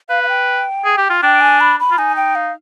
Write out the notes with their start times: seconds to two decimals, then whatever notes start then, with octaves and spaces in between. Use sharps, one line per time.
0.09 B4 F5
0.23 F5
0.29 G5
0.85 G#4
0.97 G4
1.10 F4
1.22 D4 G5
1.41 G#5
1.61 B5
1.80 B5
1.91 F4
1.98 D#4 G#5
2.16 G5
2.35 F5